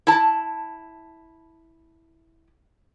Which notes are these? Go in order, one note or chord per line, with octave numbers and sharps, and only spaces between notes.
E4 A5